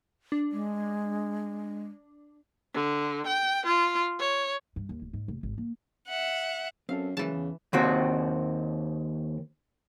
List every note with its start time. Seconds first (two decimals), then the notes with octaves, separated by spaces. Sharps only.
0.32 D4
0.52 G#3
2.74 D3
3.27 G5
3.66 F4
4.19 C#5
4.76 G2
4.89 D#2
5.02 D1
5.13 G#2
5.28 F1
5.43 G#1
5.58 A#3
6.08 E5 F#5
6.89 F#2 C4 A4 F5
7.17 C#3 E3 F#3 G#3 A#3 A5
7.34 E2
7.73 D#2 C4 F#4